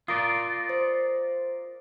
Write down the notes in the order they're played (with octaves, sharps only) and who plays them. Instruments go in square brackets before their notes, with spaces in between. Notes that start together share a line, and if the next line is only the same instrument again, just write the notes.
[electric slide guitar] F4 A#4 D5 [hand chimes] D#6
[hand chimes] C5